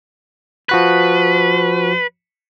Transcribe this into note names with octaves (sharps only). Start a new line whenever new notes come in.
F3 F#4 B4 F#6